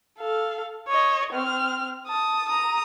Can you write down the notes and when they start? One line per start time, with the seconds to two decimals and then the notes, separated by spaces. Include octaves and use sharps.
0.19 A4 F5
0.89 C#5 D#5
1.33 C4 F6
2.07 A5 D#6
2.49 A#5 D#6